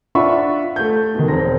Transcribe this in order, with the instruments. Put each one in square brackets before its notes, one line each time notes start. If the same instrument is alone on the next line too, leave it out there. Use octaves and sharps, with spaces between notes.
[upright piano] D4 F4 E5 F#5 B5 C#6
A3 G6
B2 D#3
E1 C4 A#6